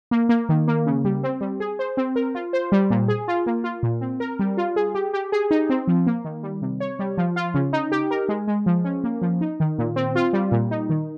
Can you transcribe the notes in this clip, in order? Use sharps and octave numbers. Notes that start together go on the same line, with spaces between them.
A#3
A#3
D#3
A#3
C#3
G3
C4
G3
G#4
C5
C4
A#4
F4
C5
G3
A#2
G#4
F4
A#3
F4
A#2
C4
A#4
G3
F4
G#4
G4
G4
G#4
D#4
C4
F3
A#3
D#3
G3
C3
C#5
G3
F3
F4
C#3
D#4
G4
A#4
G#3
G#3
F3
C#4
A#3
F3
D#4
D#3
A#2
C4
F4
G3
A#2
D#4
D#3